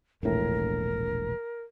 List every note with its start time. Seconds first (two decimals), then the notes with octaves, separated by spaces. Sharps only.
0.23 E1 A#1 A2 A#4